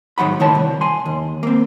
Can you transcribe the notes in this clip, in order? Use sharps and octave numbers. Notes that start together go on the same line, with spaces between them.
G#2 D#3 F#3 F#5 B5
C#2 A2 D#3 C#5 G5 A5
C2
G#5 C6
D#2
A#3 C4